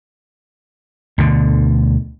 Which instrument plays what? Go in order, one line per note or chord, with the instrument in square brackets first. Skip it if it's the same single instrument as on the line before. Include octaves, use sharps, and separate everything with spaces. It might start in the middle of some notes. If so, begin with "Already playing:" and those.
[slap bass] D2 B2 D3